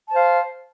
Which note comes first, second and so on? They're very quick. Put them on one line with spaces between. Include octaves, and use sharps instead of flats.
A5 C5 F5